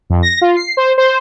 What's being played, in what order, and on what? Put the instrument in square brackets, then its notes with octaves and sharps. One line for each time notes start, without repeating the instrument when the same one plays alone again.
[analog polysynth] F2
A#6
F4
C7
C5
C5